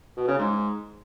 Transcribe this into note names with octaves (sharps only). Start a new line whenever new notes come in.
B2
C#3
G#2